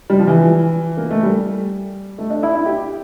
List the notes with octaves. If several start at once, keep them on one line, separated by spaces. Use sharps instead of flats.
G3
F3
E3
A#3
A3
G3
A3
D4
E4
E4
G4